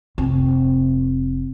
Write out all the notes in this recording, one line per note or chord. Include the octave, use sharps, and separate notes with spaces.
F1 C4